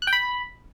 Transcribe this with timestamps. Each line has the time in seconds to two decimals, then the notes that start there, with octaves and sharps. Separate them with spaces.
0.02 F#6
0.07 G5
0.13 B5